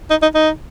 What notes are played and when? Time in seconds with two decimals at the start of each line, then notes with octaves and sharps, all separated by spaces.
0.10 D#4
0.22 D#4
0.35 D#4